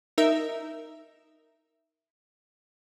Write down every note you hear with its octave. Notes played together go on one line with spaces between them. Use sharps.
D#4 A#4 E5